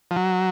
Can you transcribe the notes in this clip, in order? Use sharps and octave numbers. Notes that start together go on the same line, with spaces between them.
F3
F#3